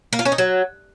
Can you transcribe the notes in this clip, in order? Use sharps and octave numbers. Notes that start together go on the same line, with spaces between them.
A#3
F4
C#4
D#4
F#3